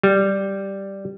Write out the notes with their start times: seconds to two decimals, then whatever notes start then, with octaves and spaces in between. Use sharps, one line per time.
0.03 G3